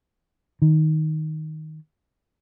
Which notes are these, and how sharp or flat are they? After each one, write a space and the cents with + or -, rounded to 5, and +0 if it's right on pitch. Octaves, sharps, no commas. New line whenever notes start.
D#3 +5